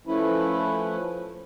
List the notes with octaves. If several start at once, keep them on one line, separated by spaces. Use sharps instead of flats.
F3 A3 C#4 E4 B4